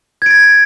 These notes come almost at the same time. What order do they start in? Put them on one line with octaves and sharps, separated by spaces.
G#6 D7 A6